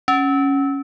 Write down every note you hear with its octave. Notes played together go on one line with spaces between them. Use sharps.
C#4